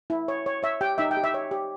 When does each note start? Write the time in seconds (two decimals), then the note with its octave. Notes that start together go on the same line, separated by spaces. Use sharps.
0.10 E4
0.28 C#5
0.46 C#5
0.63 C#5 E5
0.81 G4 G5
0.98 D#4 E5
1.11 G5
1.17 G4
1.24 E5
1.34 C#5
1.51 G4